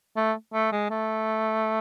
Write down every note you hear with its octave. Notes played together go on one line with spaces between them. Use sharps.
A3
A3
G#3
A3